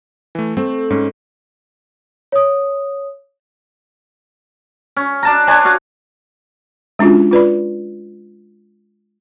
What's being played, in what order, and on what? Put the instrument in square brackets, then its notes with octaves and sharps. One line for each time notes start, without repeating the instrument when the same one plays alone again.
[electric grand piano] E3 A3
[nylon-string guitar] A3 [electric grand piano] C4
[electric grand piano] G#2 [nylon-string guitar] C#4
[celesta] C#5 D#6
[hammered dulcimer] C#4
D4 A5 A#5
D4 B4 C#5 G#5
F#4 F5 F#5
[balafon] G#3 C#4 D4 F4 F#4
F4 B4 D5 B5